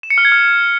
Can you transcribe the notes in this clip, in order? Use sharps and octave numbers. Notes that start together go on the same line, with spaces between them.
E7
C#7
F6
G#6
F6